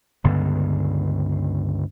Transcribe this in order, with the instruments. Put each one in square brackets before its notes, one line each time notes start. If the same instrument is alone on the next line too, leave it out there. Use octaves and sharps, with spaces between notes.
[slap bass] C#2 G2 D3 B3